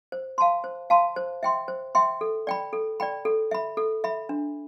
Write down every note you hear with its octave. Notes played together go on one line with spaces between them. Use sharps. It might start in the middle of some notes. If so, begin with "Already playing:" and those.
C5
F5 A5 C6
C5
F5 A5 C6
C5
E5 G5 C6
C5
E5 G5 C6
A4
D5 G5 B5
A4
D5 G5 B5
A4
E5 B5
A4
E5 B5
D4